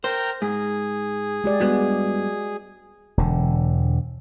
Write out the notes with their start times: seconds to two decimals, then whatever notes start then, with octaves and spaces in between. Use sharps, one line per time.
0.04 A#4 C5 G5 A#5
0.42 G#2 G#4
1.44 G#3 G4 D5
1.61 G2 G#3 B3 F#4
3.17 E1 D3